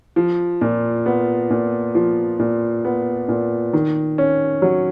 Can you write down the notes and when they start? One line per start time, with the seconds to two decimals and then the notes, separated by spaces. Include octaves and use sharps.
0.16 F3
0.61 A#2
1.06 B3
1.50 A#2
1.95 F3
2.39 A#2
2.85 B3
3.29 A#2
3.73 D#3
4.18 C#4
4.62 F#3